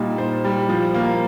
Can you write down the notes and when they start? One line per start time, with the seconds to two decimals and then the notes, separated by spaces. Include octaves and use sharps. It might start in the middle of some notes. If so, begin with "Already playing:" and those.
Already playing: A#2 G3 D#4
0.18 C5
0.44 G3
0.69 F3
0.94 A#3